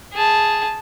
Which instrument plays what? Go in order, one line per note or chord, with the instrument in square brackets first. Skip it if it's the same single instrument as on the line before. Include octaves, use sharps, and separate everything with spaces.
[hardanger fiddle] G#4 A5